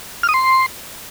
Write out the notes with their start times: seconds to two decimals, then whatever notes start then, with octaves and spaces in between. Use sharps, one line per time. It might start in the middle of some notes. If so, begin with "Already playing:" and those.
0.23 F6
0.29 D#6
0.34 C6